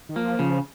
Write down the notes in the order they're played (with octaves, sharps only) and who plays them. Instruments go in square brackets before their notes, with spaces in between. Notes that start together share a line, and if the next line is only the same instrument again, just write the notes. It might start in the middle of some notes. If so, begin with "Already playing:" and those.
[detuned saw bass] D#3
[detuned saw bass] F3 [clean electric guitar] A#3
[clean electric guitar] C#3 [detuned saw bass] F3